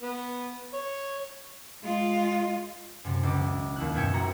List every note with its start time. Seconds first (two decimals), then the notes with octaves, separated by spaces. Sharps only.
0.02 B3
0.74 C#5
1.83 G#3 F4
3.04 F#2 C3
3.23 C#2 D6
3.36 E1
3.76 D#2 E4 F#6
3.95 F#2 B2 E5 G5 G#6 C#7
4.13 A#1 F#4 A#5